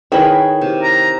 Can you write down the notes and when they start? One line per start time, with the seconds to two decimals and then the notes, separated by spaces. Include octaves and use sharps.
0.12 D#3 E4 G#4 B4 C#5
0.61 C3
0.83 A#5